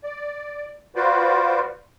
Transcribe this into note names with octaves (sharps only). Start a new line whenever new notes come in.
D5
F4 F#4 B4 C5 D5